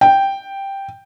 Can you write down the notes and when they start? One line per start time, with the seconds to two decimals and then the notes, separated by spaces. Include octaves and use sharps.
0.01 G5